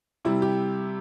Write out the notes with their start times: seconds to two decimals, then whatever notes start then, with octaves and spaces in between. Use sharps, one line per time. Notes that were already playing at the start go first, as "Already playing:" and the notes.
0.25 C3 G3 E4
0.42 G4